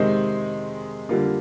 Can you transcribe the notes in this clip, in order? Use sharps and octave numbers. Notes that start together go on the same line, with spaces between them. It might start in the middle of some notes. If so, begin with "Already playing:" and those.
Already playing: C3 D#3 G#3 C4 D#4
D3 G3 A#3 F4